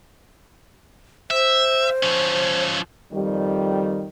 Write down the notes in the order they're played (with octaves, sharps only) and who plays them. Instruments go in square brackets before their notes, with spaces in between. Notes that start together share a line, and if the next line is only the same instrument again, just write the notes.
[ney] C5 [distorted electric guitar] E5
[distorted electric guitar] F3 C#4
[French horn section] F2 D#3 G3